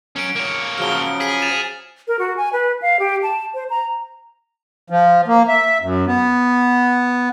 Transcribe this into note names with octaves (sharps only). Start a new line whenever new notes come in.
F#3 C#4 C#7 D7
A#3 C#5
C#3 F3 F#3 F6 G7
G#4 B6 D#7 G7
A6 E7 F7
A#4
F#4
G#5
B4
F5
G4
A5
C5
A#5
F3
A#3
E5
F#2
B3